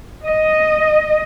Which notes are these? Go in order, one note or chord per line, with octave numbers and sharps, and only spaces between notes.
D#5